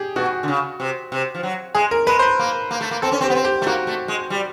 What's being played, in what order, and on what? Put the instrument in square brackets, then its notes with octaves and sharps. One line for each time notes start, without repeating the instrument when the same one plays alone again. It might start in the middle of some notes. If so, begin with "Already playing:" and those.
Already playing: [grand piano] G4 G#4
[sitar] B2 [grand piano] F#4
[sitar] D3
C#3
C3
C3
F3
F#3
[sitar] G#3 [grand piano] G#4
[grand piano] A#4
[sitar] G#3 [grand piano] B4
[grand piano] C5
B4
[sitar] A#3
A#3
A3
A#3
[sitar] C4 [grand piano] A4
[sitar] C#4
C4
[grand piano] G4
[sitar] B3
C4
[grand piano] G4
[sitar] A3
[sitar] A#3 [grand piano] F#4
[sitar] A3
G#3
G3